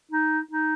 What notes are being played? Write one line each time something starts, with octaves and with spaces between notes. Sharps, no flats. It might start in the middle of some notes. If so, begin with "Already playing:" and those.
D#4
D#4